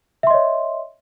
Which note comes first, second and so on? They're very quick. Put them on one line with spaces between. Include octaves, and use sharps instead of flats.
E5 C6 D#5 C#5